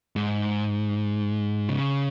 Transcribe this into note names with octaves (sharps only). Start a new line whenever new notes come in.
G#2
C#3